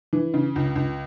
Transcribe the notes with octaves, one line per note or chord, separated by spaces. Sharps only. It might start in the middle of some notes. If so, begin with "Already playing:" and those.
E3
C#3
C#2
C#2